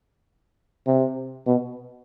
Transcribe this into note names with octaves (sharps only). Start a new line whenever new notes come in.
C3
B2